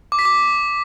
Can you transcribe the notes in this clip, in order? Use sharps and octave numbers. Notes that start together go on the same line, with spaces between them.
D6
B6
D6